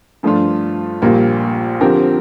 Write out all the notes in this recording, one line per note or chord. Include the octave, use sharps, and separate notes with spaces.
G2 F3 A3 D4 F4
A#1 A#2 G3 A#3
D3 F3 C4 G4 A#4